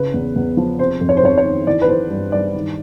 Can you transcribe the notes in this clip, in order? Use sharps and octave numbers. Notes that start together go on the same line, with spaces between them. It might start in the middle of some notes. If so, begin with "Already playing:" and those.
Already playing: C#3 B4
E2
E2
F3
C3 C5
F2
C#5
C5
F2 C#5
C#5
D#3
E3 D5
B4
E3 C5
G2
G2 D5
D#3